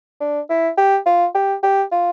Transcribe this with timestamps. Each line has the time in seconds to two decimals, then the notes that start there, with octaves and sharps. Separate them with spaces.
0.20 D4
0.50 E4
0.78 G4
1.06 F4
1.35 G4
1.63 G4
1.92 F4